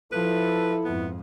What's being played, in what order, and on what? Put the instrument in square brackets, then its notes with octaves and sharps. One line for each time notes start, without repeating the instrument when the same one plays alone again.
[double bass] F3 [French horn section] E4 [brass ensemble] A4 [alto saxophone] B4
[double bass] F2 G#2 [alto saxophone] B3